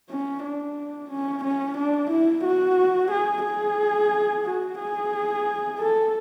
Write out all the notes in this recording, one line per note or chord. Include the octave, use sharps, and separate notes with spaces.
C#4
D4
C#4
C#4
D4
E4
F#4
G#4
G#4
F#4
G#4
A4